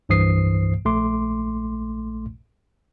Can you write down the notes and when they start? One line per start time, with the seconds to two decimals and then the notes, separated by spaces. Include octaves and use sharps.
0.09 C2 G2 E3 C5 D#6 C7
0.85 A#1 A3 C6 D6